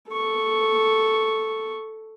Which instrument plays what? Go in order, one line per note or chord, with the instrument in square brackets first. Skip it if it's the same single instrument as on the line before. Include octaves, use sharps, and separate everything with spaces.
[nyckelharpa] A4 C#6